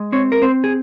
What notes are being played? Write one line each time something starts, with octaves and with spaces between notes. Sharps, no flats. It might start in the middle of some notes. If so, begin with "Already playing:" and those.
Already playing: G#3
C4 C#5
A#4
C4 C5
G#4